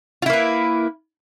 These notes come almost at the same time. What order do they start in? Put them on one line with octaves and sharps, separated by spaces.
F4 E4 A#3 B4